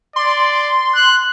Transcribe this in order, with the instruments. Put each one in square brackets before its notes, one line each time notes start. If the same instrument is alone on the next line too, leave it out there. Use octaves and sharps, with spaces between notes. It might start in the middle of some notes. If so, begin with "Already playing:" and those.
[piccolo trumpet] D5 [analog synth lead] C6
[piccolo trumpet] F#6